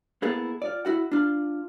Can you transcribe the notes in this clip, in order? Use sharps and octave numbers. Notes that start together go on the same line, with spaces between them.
A#3 B3 E4 G#4 A4
F4 D5
E4 F#4 F#5
D4 F4